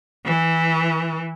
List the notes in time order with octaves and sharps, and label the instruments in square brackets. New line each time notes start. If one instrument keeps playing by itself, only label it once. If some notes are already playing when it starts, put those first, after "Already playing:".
[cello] E3